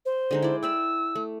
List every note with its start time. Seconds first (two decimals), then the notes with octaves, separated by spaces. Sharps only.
0.06 C5
0.31 D3 G#3 D#4
0.42 E4 D5
0.63 D5 E5 G5 E6
1.15 A3